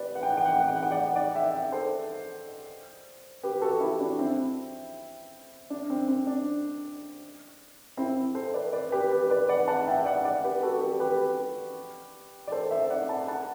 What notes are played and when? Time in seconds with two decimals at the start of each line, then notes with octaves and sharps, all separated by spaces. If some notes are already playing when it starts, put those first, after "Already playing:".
Already playing: G4 B4 D5
0.15 F#5
0.23 G5
0.30 F#5
0.37 G5
0.45 F#5
0.53 G5
0.60 F#5
0.68 G5
0.75 F#5
0.83 G5
0.91 D5 F#5
1.16 D5 F#5
1.35 E5 G5
1.54 E5 G5
1.72 A4 C5
3.43 G4 B4
3.62 F#4 A4
3.80 E4 G4
3.99 D4 F#4
4.19 C4 E4
5.70 D4
5.90 C4
6.08 C4
6.27 D4
7.97 C4 E4
8.35 A4 C5
8.54 B4 D5
8.73 B4 D5
8.92 G4 B4
9.11 G4 B4
9.30 B4 D5
9.49 D5 F#5
9.68 F#5 A5
9.87 E5 G5
10.05 D5 F#5
10.25 D5 F#5
10.44 G4 B4
10.63 F#4 A4
10.81 G4 B4
11.00 G4 B4
12.47 D5
12.52 A4 C5
12.71 C5 E5
12.90 D5 F#5
13.08 F#5 A5
13.28 F#5 A5